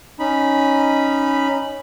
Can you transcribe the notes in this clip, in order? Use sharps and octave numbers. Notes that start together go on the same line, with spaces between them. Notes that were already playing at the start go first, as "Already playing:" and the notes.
C#4 D#4 B5